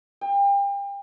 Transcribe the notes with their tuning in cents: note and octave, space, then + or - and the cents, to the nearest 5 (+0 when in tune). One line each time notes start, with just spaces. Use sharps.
G5 +35